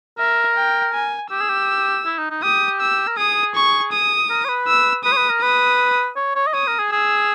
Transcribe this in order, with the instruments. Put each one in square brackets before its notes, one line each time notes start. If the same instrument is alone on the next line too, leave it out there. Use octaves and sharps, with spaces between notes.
[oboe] A#4 [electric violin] E5
[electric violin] G5
G#5
[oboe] G4 [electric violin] E6
[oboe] G#4
G4
E4
D#4
D#4
[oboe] G4 [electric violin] D#6
[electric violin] E6
[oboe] A#4
[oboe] G#4 [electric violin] D#6
[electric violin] C#6
D#6
[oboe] A#4
C#5
B4
[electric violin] E6
[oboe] B4 [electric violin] D#6
[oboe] C#5
B4
A#4
[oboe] B4 [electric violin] D#6
[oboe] C#5
C#5
D#5
[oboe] C#5 [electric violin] D#6
[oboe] A#4
G#4
[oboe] G#4 [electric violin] E6